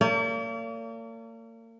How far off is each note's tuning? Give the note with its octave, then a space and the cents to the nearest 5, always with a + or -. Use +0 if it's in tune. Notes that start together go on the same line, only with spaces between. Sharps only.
A#3 -40 D5 -45